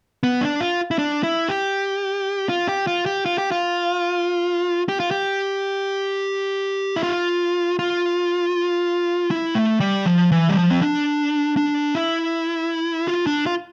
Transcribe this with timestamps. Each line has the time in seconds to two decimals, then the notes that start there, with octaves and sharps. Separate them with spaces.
0.23 B3
0.41 D4
0.60 F4
0.91 E4
0.99 D4
1.23 E4
1.49 G4
2.49 F4
2.68 G4
2.87 F4
3.06 G4
3.26 F4
3.38 G4
3.52 F4
4.89 G4
5.00 F4
5.11 G4
6.96 E4
7.03 F4
7.79 F4
9.31 E4
9.55 A3
9.80 G3
10.06 F3
10.32 E3
10.49 G3
10.56 F3
10.71 C4
10.82 D4
11.57 D4
11.95 E4
13.08 F4
13.27 D4
13.46 F4